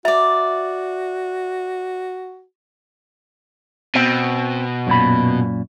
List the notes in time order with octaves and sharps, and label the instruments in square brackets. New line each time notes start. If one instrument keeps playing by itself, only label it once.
[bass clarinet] F#4 [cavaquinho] D5 A#5 [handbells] E5
[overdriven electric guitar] B2 [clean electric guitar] C4
[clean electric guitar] F#2 A#2 B5